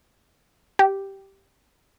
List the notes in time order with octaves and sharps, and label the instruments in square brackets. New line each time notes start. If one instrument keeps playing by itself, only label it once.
[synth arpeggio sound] G4